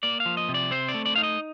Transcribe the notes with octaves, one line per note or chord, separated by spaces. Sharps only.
A#3 D5
F5
F3
D#5
C3
D5
C4 C5
D5
A3
D5
D#4 F5
D#5